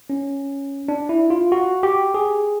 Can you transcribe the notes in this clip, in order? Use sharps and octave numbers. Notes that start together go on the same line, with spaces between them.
C#4
D4
E4
F4
F#4
G4
G#4